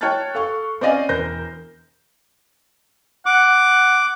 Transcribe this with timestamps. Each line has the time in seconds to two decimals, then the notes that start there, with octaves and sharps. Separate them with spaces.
0.01 C#5 G5 A5 F6 F#6 A6
0.35 A4 F5 C#6
0.81 C4 C#4 D5 D#5 F5 G#5
1.09 E1 A#4 C5 G6 A#6
3.26 F#5 D6